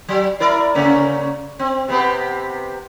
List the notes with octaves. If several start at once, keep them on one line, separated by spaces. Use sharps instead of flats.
F#3
E4 A#4 D5
C#3 A#3 C#4
C4
C3 B3 G4